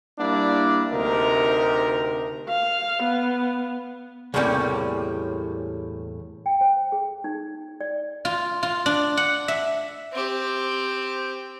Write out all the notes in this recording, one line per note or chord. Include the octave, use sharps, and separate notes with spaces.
G3 A#3 D4 E4
D2 C3 D#4 A#4
F5
B3
E2 A2 C3 G3 A#3 C#4
G5
C5
G#4
D#4
D5
F4
F4
D4
F#5
E5
C4 G4